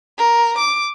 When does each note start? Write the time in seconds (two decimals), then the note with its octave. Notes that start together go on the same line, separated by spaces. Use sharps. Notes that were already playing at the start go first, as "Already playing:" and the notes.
0.18 A#4
0.58 D6